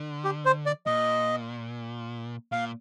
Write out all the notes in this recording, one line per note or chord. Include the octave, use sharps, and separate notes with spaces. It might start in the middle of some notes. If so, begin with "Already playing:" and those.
Already playing: D3
G4
C5
D5
A#2 D#5
A#2 F5